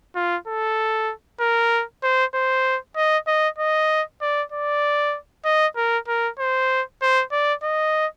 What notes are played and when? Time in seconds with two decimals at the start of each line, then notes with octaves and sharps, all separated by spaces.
0.15 F4
0.47 A4
1.40 A#4
2.03 C5
2.34 C5
2.96 D#5
3.27 D#5
3.58 D#5
4.21 D5
4.52 D5
5.45 D#5
5.76 A#4
6.08 A#4
6.39 C5
7.02 C5
7.32 D5
7.63 D#5